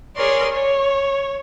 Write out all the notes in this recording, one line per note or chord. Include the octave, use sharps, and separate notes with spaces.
G#4 A#4 C#5 D5 C6
C#5